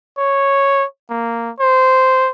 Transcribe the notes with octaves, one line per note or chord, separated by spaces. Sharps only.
C#5
A#3
C5